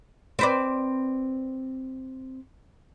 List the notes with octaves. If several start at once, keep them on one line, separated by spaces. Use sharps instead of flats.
C4 B4 D5